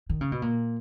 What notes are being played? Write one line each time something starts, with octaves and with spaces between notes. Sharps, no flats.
D#3
C#3
B2
A#2